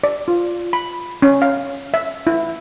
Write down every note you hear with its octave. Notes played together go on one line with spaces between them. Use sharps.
D5
F4
B5
C#4
F5
E5
E4